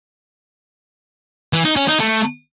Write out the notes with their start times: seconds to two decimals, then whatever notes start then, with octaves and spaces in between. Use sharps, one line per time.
1.53 E3
1.65 D#4
1.76 C#4
1.88 D#4
1.99 A3